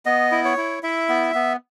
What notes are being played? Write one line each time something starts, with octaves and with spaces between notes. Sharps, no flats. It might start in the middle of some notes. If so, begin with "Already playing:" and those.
B3 D#5
E4
C#5
E4
E4 E5
B3
B3